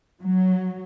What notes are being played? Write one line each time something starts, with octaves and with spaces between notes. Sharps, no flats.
F#3